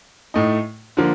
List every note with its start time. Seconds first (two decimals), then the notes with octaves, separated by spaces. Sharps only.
0.34 A2 A3 D#4
0.97 D3 F3 A#3